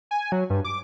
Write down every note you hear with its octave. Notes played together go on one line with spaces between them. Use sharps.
G#5
F#3
G2
D6